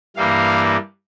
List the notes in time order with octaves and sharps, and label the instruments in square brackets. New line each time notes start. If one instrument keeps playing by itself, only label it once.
[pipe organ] G2 E3 G3 A#3 F5